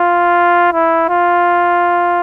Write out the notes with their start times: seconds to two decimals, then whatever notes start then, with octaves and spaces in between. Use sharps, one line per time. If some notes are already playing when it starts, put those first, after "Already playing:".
Already playing: F4
0.73 E4
1.09 F4